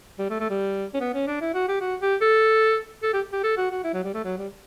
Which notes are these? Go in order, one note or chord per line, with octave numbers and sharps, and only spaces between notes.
G3
A3
A3
G3
C#4
B3
C#4
D4
E4
F#4
G4
F#4
G4
A4
A4
G4
G4
A4
F#4
F#4
E4
F#3
G3
A3
F#3
G3